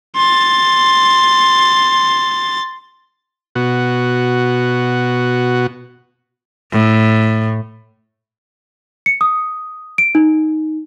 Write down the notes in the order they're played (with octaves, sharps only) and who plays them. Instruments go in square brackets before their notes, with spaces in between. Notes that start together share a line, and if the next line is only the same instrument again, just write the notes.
[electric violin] C6 A6
[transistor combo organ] B2 F#4
[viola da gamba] A2
[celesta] C#7
D#6
D7
D#4